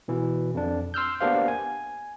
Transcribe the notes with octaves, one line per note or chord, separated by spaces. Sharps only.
B2 E3
F2 D4
C6 E6 F6 G6
A#3 B3 D4 G4 C5 F5
G#5